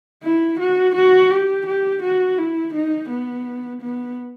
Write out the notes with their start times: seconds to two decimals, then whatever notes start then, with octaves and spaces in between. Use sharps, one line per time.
0.24 E4
0.60 F#4
0.96 F#4
1.31 G4
1.67 G4
2.03 F#4
2.38 E4
2.74 D#4
3.09 B3
3.82 B3